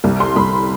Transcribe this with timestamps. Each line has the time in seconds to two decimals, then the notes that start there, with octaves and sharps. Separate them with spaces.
0.04 C2
0.20 C6
0.36 C2 B5